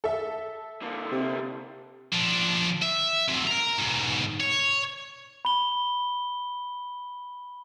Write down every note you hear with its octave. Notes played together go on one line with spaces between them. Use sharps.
A4 E5
D3 A#3
C3
F3 D4
E5
F#3 C4
A#4 A#5
G#2 B2
C#5
B5 G7